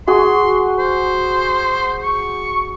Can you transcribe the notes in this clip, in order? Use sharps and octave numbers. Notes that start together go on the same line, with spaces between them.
F#4 G#4 C6
C5
C#6